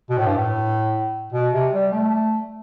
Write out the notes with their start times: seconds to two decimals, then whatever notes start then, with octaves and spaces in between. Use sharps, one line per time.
0.10 B2
0.18 A2
0.26 G2
0.36 A2
1.32 B2
1.53 C3
1.73 G3
1.92 A3